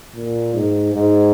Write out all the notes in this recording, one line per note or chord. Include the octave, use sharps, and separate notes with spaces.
A#2
G#2
G#2